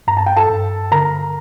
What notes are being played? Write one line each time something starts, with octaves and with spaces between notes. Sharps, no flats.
G2 A#5
A5
G5
A4 A5
G2
D3 A#4 A#5